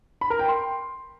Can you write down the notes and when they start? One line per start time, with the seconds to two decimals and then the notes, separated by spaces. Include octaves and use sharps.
0.21 B5
0.30 A#4
0.39 G5
0.48 C6